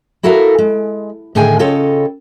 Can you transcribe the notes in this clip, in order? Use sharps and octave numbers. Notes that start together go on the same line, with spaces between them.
E4 F#4 A4 A#4 E5 F5
G#3
A2 D3 D#3 G#4 G5 G#5
C#3 F4 A4 C#5 D#5 G5